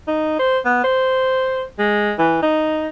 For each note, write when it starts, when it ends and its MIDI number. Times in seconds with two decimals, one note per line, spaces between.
0.08 0.37 63
0.39 0.59 72
0.65 0.83 59
0.84 1.64 72
1.79 2.13 56
2.19 2.41 52
2.42 2.87 63